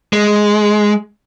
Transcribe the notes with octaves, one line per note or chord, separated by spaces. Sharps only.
G#3